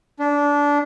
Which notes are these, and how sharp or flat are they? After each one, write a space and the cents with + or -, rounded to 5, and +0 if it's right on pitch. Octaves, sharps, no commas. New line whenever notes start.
D4 -20